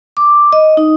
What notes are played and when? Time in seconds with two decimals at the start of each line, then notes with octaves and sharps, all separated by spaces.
0.17 D6
0.53 D#5
0.77 D#4